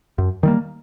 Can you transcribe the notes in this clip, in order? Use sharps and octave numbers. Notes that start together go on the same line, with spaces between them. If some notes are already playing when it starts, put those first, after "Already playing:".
F#2
D#3 G3 A#3